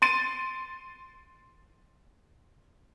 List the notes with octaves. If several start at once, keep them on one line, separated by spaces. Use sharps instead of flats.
C6 A6 D#7